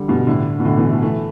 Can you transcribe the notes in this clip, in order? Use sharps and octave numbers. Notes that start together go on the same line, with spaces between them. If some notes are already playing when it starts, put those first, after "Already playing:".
Already playing: D3 G3
G2 B2
A2 D3
B2
A2 D3
B2 E3
E3 A3
E3 A3